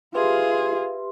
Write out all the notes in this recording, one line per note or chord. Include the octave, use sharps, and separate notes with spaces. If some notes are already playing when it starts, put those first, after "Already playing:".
F4 G4 G#4 B4 E5 C6